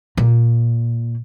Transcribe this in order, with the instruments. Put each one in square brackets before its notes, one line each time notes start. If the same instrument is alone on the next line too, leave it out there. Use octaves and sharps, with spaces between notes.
[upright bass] A#2